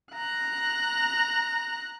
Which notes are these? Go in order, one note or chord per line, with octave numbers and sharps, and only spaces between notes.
A#5 F#6